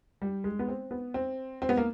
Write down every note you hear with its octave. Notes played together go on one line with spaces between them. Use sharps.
G3
G#3
B3
C4
B3
C4
C4
B3
A#3